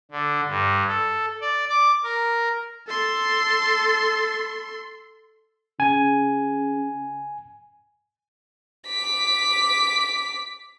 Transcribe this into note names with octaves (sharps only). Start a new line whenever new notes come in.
D3
G2
A4
D5
D6
A#4
A4 C6
C#3 G#5
D6 B6